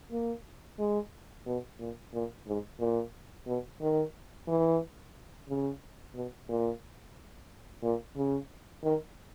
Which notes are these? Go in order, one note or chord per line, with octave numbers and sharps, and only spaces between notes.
A#3
G#3
B2
A#2
A#2
G#2
A#2
B2
D#3
E3
C#3
B2
A#2
A#2
C#3
D#3